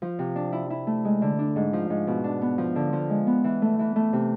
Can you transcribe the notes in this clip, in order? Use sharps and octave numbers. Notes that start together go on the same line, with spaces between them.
F3
C3
D4
E4
E4
A3
G#3
D3
D4
G#2
F3
G#2
B2
D4
B3
F3
D3
F3
G#3
B3
E3
A3
E3
A3
C3